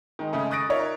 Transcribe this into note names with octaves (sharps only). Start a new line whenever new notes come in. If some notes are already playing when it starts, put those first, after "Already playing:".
D#3 G#3
C#3 G#3 A3 C#4 G#4
C#6 D#6 F#6 A6 A#6 D7
D#4 F4 A#4 C#5 E5